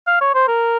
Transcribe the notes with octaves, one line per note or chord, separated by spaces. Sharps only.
F5
C#5
C5
A#4